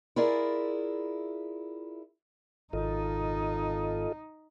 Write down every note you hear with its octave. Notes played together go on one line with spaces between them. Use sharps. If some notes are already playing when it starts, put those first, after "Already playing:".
E4 F4 G#4 A#4 D5 E5
G#1 D#4 F4 A4 D#5